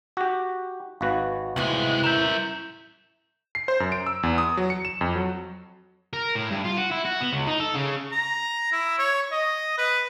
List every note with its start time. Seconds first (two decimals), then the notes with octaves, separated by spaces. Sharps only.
0.17 F#4 G4
1.01 G#1 F#4 B4 F5
1.56 C2 A2 C3 E3 G#3
2.04 A#4 E5 G6 E7
3.55 C7
3.68 C5
3.80 F#2
3.92 D7
4.06 E6
4.23 E2
4.38 D#6
4.57 F#3
4.70 C#7
4.85 E7
5.01 F2
5.16 F#3
6.13 A#4
6.35 A2
6.51 G2
6.64 F4
6.77 F#4
6.91 E4
7.05 F#4
7.21 B3
7.32 C#2
7.47 D#4
7.60 A4
7.75 C#3
8.11 A#5
8.72 E4
8.98 C#5
9.32 D#5
9.78 B4